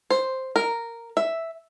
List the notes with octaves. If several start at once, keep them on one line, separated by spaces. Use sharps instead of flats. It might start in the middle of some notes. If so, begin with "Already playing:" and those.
C5
A#4
E5